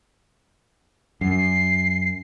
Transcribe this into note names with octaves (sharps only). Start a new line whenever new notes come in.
F#2 C7